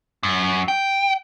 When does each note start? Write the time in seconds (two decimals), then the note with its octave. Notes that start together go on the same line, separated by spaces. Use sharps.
0.23 F#2
0.68 G5